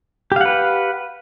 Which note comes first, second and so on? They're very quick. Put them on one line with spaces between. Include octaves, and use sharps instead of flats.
G4 F5 F#5 B4